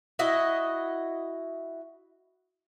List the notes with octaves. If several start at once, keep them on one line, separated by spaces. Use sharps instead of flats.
E4 F#4 D#5